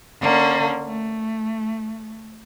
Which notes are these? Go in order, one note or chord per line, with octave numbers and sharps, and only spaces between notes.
D3 A#3 C#4
A3